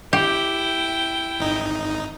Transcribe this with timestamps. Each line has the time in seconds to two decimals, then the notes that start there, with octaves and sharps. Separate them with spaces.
0.13 E4 G4 G5
1.40 G#1 D#4